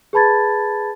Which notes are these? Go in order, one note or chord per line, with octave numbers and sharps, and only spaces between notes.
G#4 B4 A5 B5 G#6 A6